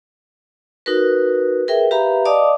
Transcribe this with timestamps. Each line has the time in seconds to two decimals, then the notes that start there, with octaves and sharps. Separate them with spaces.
0.86 D#4 F#4 A#4 B4
1.68 G#4 A#4 B4 E5 G5
1.91 G4 B4 E5 F5 A#5 B5
2.25 D5 D#5 F5 A5 D6 D#6